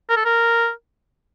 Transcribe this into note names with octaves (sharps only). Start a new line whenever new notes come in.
A#4
A4
A#4